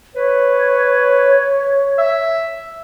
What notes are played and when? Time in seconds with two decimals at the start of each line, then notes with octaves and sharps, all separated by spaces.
0.15 B4 C#5
1.98 E5